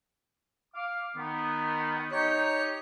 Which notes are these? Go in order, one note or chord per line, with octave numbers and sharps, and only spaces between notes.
F5 D6
D#3 B3
D#4 G4 C#5